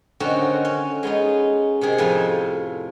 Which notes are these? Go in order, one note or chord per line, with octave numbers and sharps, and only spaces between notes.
D3 D#3 C4 C#4 D#4 F#4
C#4
G#3 B3 C#4 D#4
C3 D#3 G#4 A#4
F2 A2 F4 G#5